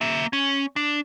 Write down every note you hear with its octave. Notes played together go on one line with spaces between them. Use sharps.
A#3 E5
C#4
D4